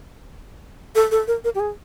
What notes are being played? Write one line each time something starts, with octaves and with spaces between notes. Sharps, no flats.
A4
A4
A#4
A#4
G4
G#4